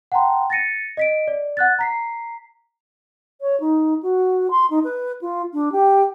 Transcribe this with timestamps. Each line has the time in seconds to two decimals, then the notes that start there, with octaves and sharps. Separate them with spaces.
0.12 F#5 G5 A5 A#5 C6
0.50 A6 A#6 C#7 D#7
0.97 D#5 B6 D7
1.28 D5
1.57 F#5 F#6 A6
1.79 A#5 B6 C7
3.41 C#5
3.60 D#4
4.03 F#4
4.51 C6
4.70 D#4
4.84 B4
5.22 F4
5.53 D4
5.72 G4